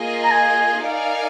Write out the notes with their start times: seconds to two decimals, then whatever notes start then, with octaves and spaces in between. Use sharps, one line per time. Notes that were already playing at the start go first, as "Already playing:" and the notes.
Already playing: A#3 F4 G#4 D#5
0.24 A#5
0.31 G#5
0.83 D#4 A#4 D5 F5 G#5